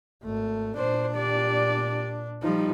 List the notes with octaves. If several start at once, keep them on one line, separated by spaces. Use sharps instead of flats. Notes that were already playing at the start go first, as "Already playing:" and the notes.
G#1 A3
A#2 D4 C5
G4 D5
F3 G3 D#4